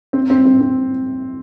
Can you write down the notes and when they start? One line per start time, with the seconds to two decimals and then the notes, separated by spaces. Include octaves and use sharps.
0.13 C4
0.30 C4
0.46 C4
0.61 C4